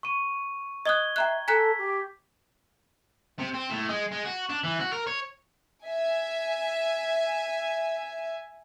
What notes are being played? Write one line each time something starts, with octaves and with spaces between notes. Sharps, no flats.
C#6 D#7
D#5 D#6 F#6 G#6 G7
E5 G5 A#5 F#6
A4 G#5 A#5 F#6 B6
G4
C3
C4
A2
G#3
G#3
F#4
D4
E3
F#4
A#4
C#5
E5 G#5